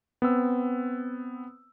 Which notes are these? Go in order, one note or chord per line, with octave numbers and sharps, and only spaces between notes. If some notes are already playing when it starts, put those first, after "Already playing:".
B3 C4 E6